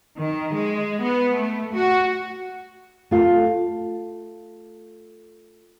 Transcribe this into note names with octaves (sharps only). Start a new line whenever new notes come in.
D#3
G#3
B3
A3
F#4
A3 F4